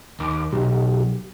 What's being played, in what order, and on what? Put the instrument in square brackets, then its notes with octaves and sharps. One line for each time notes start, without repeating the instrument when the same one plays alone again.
[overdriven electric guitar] D#2 [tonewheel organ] D6
[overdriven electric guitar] B1 [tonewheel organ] G4